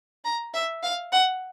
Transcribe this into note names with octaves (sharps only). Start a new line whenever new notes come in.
A#5
E5
F5
F#5